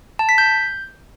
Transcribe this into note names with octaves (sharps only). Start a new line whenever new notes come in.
A5
B6
G6